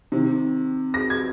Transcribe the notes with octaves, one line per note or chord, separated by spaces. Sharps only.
C3 D#3
A#6
G#6